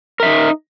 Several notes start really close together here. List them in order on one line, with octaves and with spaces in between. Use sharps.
A#4 E5 D#4